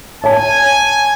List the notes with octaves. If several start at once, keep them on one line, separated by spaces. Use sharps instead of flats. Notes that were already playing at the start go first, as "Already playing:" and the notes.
C#5 G#5 A5